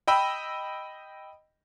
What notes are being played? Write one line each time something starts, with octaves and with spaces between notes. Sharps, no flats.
D#5 G5 B5 E6